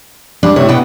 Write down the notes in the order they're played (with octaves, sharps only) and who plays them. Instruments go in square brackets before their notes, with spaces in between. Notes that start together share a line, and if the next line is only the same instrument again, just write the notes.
[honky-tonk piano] G3 D6 [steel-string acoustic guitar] D4
[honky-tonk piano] A2 C3 [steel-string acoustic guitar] C#5
[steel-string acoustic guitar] B2 F#5 G5 [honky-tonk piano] B3